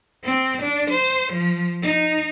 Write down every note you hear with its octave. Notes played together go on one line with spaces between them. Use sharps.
C4
D4
C5
F3
D#4